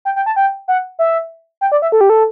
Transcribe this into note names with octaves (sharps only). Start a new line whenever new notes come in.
G5
G5
A5
G5
F#5
E5
G5
D5
E5
A4
G4
A4